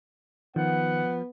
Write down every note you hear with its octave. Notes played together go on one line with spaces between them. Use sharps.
D#3 F3 B3 F#5